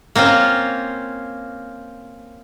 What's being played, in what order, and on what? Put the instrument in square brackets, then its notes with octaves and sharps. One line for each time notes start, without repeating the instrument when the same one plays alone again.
[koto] A#3 C4 C#4 F4